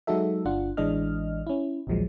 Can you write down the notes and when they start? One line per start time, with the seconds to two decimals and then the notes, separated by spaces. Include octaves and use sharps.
0.07 F#3 G#3 D#4 F#4 A4 E5
0.45 G1 D4 F4 F#5
0.77 A1 E3 G#3 D4 D#5 F6
1.47 C#4 E4
1.87 A#1 D#2 A#2 F3 F#3 G#3